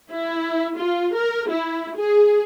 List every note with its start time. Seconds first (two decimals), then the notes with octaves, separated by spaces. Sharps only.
0.11 E4
0.77 F4
1.15 A#4
1.50 E4
1.96 G#4